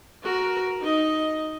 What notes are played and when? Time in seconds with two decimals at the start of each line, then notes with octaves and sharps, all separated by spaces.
0.23 F#4 A#4
0.81 D#4 D#5